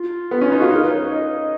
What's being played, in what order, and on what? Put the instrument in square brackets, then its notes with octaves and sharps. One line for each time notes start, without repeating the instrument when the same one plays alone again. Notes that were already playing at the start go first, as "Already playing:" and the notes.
Already playing: [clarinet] F4
[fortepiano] B3
C#4
D#4
[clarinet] F#4
[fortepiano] F4
[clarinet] G#4
[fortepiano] D#4 [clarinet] A#4
[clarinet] B4
C#5
D#5